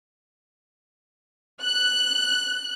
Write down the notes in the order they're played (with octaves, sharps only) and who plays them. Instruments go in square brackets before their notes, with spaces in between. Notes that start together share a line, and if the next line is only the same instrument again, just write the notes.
[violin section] F#6